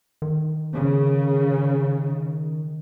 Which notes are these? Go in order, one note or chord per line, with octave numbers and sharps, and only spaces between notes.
D#3
C#3